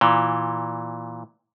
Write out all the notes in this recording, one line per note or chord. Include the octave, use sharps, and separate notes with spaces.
A#2 E3